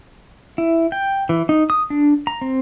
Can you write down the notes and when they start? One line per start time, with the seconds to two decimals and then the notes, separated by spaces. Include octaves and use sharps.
0.58 E4
0.92 G5
1.29 E3
1.49 D#4
1.70 D#6
1.90 D4
2.27 A#5
2.42 C4